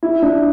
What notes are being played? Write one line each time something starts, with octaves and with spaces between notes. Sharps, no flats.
E4
D4